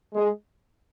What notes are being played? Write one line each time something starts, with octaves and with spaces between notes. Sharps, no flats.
G#3